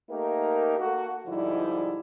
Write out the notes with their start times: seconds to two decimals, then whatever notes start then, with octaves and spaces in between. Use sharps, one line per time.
0.10 A3 A#3 D#4 G4 A#4
0.79 A#3 F#4 A4
1.27 G#2 D3 F3 G3 D#4 E4